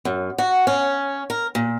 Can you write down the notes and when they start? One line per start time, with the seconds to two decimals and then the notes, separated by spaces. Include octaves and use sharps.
0.05 F#2
0.38 F#4
0.67 C#4
1.30 A#4
1.55 A#2